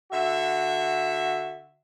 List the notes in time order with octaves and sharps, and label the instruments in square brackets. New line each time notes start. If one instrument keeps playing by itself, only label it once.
[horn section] D3 F#4 E5